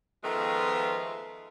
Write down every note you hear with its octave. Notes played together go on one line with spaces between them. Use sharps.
D#3 F3 G#3 A3 B3 F4